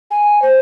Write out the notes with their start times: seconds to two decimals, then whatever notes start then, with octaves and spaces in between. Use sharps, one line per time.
0.11 G#5
0.42 C5